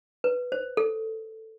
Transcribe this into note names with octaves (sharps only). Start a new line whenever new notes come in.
B4
C5
A4